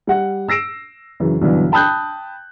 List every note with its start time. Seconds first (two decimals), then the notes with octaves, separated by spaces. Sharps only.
0.07 G3 F#5
0.48 E6 A#6 C7 D7 E7
1.20 F#2 C#3 E3
1.41 B1 G2 D3 E3
1.72 G5 A5 B5 D#6 F#6 G6